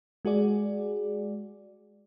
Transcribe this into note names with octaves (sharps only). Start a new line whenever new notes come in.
G#3 F#4 G#4 D5